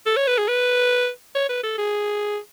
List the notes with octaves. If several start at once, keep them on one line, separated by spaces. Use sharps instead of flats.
A4
C#5
B4
G#4
B4
C#5
B4
A4
G#4